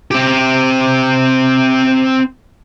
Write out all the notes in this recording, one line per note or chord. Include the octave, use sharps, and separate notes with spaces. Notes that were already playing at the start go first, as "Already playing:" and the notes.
C4 G4